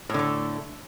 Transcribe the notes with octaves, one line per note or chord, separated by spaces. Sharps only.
A2 D3 A3